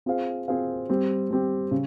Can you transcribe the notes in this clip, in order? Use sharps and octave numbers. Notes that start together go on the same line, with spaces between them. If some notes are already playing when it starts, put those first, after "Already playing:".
C4 F4 G#4 C5 F5
C4 F4 G#4 C5 F5
G3 C4 G4
G3 C4 G4
C#3